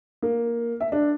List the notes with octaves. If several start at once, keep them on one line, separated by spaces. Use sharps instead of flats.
A#3
E5
D4